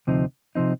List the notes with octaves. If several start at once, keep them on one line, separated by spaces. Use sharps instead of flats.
D2 C3 F3 C4 D#4
C3 F3 C4 D#4